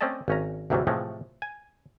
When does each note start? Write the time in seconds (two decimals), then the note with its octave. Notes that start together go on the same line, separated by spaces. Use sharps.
0.01 A3 C4 C#4 D5 D#5 A5
0.28 G#1 C#4 A#5
0.70 D2 G#2 C3 E3 F#3 G3
0.87 A2 C3 E3 F3 G#3 A3
1.42 G#5